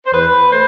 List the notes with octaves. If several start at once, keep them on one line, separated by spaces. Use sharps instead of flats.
C5
E2 B4
A3 C5